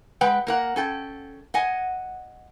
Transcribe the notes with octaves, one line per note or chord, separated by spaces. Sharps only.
G#3 B4 F#5 G5
A#3 A#4 F#5
C#4 A4 G5
D#5 F#5 G#5